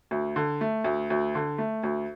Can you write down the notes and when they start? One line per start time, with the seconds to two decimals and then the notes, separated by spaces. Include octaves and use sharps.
0.11 D2
0.36 D3
0.61 A3
0.84 D2
1.10 D2
1.35 D3
1.58 A3
1.83 D2